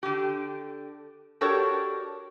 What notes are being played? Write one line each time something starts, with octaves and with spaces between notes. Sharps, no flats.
D3 G4
D4 F#4 G4 A4 A#4 C#5